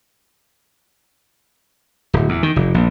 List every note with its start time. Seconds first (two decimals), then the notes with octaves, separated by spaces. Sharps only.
2.13 D1
2.29 E2
2.43 D#3
2.56 F1
2.74 A#1